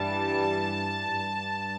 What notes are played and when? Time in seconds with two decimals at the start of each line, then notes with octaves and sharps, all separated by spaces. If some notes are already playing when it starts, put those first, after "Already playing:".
Already playing: G2 E3 G3 A5
1.13 G2